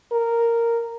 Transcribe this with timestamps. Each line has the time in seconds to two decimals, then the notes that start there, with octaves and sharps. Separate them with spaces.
0.12 A#4